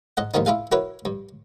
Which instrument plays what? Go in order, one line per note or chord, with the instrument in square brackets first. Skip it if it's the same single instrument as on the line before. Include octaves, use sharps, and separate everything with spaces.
[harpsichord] G#2 D#5 F#5
D#2 G#2 D#3 F3 B3 D#4
E4 F4 G#4 F5
E4 F#4 A#4 B4 C#5
G2